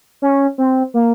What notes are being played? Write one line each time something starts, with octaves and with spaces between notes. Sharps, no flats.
C#4
C4
A#3